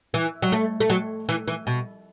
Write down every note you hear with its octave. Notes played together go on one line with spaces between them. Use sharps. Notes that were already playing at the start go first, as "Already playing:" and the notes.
E3
F#3
A3
A3
F#3
E3
E3
B2